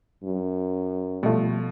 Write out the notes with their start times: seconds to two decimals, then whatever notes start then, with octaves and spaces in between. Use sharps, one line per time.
0.24 F#2
1.23 B2 F3 G3 A3